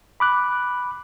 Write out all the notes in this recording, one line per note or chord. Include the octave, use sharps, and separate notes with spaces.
B5 D6 F#6